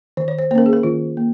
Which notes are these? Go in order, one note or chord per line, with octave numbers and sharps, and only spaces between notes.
D#3 C5
C#5
C5
A#3 C#4 A#4 C5
G#4
A#4
D#3 F4
A#3